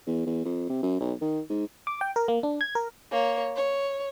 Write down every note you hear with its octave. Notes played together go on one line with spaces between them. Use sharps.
E2
E2
F2
C3
F#2
B1
D#3
G#2
D6
G5
A#4
A#3
D4
G#6
A#4
A#3 C#5
C#5